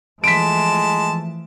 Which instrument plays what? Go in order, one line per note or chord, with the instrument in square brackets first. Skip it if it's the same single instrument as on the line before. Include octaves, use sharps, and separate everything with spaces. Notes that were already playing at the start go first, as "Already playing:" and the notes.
[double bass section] E3 F3 A3 [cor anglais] G#3 [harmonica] A5 [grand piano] B6 D7